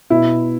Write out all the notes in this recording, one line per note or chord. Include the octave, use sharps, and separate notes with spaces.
B2 E4